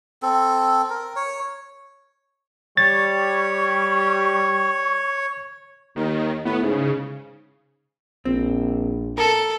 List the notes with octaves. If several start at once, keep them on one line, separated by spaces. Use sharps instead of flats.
C4 A4
A#4
C#5
G3 C#5 C#6 A6
D#2 D#3
A2 B3
G#2 C#3
A#1 C4
A4 A#4